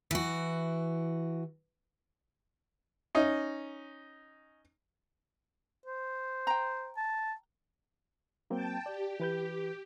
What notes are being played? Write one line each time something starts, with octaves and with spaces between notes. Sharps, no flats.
E3 F#4
C#4 D#4
C5
G5 A#5
A5
F#3 A#3 C4 G5 A5
G4 D5
E3 B4 G6